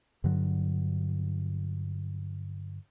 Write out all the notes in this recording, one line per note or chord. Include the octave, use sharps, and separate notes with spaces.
G2 D3 F#3